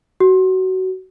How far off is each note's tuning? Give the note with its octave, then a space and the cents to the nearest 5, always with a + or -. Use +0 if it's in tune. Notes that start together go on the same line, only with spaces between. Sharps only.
F#4 +20